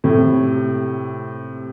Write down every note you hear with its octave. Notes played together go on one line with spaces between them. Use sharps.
A2 C3